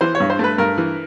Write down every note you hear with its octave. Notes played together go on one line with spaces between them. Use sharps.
E3 C5
C#5
G2
C5
A3 B4
G2 A#4
E3